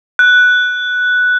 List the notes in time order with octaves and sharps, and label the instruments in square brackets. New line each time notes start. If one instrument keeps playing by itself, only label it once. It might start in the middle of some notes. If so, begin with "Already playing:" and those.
[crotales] F#6